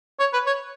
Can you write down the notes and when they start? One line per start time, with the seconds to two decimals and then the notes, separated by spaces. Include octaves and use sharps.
0.19 C#5
0.33 B4
0.46 C#5